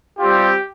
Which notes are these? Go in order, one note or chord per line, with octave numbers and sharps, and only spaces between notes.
G3 C4 F4 G4